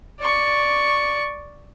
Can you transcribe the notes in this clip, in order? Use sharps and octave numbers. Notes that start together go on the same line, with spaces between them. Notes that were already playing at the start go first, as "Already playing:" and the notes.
D5 C#6